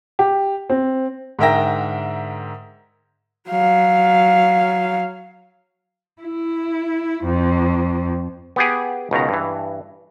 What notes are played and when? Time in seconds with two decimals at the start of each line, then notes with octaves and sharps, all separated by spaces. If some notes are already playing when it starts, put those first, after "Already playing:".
0.19 G4
0.70 C4
1.39 G#2 D3 A#4 E5 G5 A#6
3.49 F#3 F5
6.22 E4
7.24 F2
8.56 B3 G4 G#4
9.11 C#2 B2 D#3 A#5
9.29 G2 E3